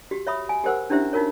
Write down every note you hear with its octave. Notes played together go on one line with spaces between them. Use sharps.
F#4 G4
C#5 E5 B5 D#6
G#5
G4 A#4 C5 F#5 E6
C#4 D4 E4 G4 C5 E5
D#4 F4 F#4 A#4 C#5